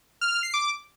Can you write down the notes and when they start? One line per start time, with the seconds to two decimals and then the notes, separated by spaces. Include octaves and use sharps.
0.21 F6
0.32 F6
0.43 C7
0.54 D6